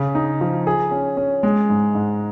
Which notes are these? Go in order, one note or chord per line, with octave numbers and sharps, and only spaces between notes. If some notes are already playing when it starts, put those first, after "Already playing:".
Already playing: C#3
D#4
F3
G#4
C#4
C#4
G#3
G#2
G#2